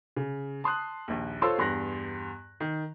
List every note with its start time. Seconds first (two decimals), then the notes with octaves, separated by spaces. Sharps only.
0.17 C#3
0.64 A5 C6 D#6 F#6
1.08 A#1 D#2
1.42 F4 A4 C5 C#5 C6 E6
1.58 E2 G2 C6 F#6 A#6
2.60 D#3